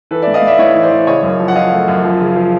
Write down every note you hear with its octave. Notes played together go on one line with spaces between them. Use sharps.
E3 A4 B4
D5 E5
A2
D#5 F5
A2 D5 E5
A2 C#5 D#5
E3
C5 D5
E3
C#3 C#5 D#5
F#2
F3
F#5
F3 D#5 F5
A3
F#2
F3
C#3
F3